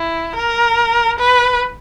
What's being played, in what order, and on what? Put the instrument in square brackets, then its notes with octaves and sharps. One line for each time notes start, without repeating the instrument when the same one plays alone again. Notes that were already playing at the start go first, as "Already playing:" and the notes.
Already playing: [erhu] E4
A#4
B4